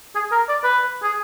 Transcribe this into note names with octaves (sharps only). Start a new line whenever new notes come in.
G#4
A#4
D5
B4
G#4